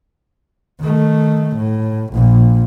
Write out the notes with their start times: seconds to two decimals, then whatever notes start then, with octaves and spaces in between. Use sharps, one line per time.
0.80 D#3 A3
1.57 A2
2.14 A#1 A#2